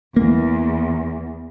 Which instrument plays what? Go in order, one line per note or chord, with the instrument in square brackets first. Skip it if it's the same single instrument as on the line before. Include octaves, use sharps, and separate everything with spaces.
[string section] E2 [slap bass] A#3